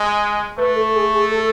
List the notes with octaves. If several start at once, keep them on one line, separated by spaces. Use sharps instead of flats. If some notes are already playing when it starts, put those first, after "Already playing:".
Already playing: G#3
A3 B4
A4
G#4
G#4
A4